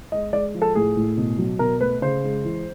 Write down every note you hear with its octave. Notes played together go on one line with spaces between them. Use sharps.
G#3 D#5
G#3 D5
F3
A4
A2 G#4
A2
B2
F#3
B2 A#4
A3 B4
C#3 C5
G#3
E3